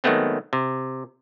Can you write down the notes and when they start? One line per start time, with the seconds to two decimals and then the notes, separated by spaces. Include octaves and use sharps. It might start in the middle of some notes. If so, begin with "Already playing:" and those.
0.04 D#3 F#3 G#3 A3 B3 C4
0.53 C3